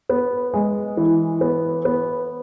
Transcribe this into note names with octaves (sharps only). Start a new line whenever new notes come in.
B3
G#3
E3
B3
B3